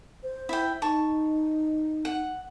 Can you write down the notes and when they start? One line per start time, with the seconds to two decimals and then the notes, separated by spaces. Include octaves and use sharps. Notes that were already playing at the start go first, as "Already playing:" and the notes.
0.23 C5
0.49 E4 G5
0.82 D#4 A5 C#6
2.05 F#5